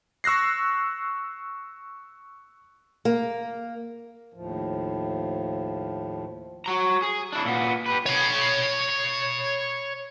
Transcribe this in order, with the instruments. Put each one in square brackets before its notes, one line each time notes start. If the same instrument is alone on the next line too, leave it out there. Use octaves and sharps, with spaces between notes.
[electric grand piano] C#6 E6 F#6 A#6 C7
[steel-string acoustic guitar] A#3
[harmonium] D#2 A2 F3
[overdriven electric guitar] F#4 A#5
G#4
D4 E4
A#2 B3
G4 B4
[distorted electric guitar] C#5 B5